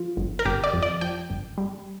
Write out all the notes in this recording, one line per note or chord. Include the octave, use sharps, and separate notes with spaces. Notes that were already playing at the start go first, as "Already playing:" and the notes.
Already playing: F3 F4
G1
A#4
G1 G4
D5
F2
D5
F3 G5
G1
G3